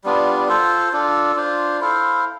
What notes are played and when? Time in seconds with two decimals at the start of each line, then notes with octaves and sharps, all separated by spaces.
0.04 G3 B3 D4 F4
0.49 F4 A4 C5
0.93 D4 F4 A4
1.36 D4 F4 C5
1.81 E4 A4 C5 F5